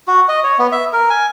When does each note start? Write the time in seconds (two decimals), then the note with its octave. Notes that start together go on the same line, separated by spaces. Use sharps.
0.08 F#4
0.28 D#5
0.44 C#5
0.59 B3
0.72 E5
0.93 A#4
1.10 G#5